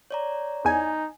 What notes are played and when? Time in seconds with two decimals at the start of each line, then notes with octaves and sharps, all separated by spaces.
0.11 C#5 D5 A#5
0.65 E2 D#4 G#5